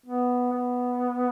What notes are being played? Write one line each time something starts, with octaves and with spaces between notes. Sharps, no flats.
B3
B3